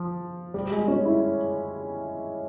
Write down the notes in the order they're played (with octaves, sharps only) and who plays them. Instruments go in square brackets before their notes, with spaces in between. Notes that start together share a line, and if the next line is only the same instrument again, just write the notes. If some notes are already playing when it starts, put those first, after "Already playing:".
Already playing: [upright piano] F3
G3
G#3
C#4
E4